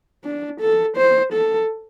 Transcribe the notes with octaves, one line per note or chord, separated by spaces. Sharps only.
D4
A4
C5
A4